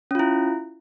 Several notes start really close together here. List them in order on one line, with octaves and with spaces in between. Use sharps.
C#4 F4 E4